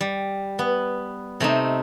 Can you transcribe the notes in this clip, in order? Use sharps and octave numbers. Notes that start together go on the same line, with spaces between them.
G3
B3
C3 A3 C4 D#4